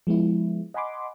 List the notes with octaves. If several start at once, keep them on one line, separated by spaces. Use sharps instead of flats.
F3 G#3 B3 E4
D#5 F#5 G#5 B5 C6 D6